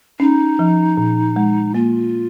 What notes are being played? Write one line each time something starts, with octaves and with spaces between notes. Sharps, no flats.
C#4 D#4
F3
A#2
G#3
A#3 F4